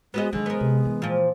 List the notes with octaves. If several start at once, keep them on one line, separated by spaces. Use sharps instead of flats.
G#3 B3 F#4 D#5
D3 D#3 F#3 G#3
B3 A#4
C3
E3
A#2 F3